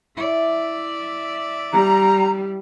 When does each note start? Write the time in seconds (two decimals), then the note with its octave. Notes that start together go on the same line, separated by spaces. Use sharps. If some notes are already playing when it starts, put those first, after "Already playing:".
0.17 E4 D5 E5
1.72 G3 A#5